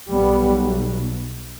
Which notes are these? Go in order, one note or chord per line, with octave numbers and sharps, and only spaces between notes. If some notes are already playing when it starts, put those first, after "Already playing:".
B1 B2 G3 B3